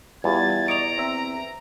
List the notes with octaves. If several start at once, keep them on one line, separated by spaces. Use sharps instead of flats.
E2 G3 F4 G4 G#6 A6
D5 D#5 A#5 C#6 D7 F7
C4 E5